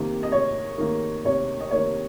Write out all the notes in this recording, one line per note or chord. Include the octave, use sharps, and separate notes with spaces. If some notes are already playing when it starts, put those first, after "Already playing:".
Already playing: C3 D#3 A#3
D#5
C3 C#5
D#3 A#3
C3 C#5
D#5
D#3 A#3 C#5